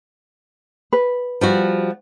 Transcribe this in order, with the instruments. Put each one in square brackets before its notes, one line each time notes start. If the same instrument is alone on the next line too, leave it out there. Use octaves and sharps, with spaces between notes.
[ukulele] B4
[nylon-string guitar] F3 G3 F#4